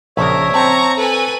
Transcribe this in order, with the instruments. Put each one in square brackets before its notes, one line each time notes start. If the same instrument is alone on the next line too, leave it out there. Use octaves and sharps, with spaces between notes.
[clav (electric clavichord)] A#1 C#3 [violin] A#4 [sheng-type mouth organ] C#5 E5
[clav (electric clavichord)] C4 A5 [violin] A#5 C#6
[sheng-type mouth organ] A4 [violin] B4 G#5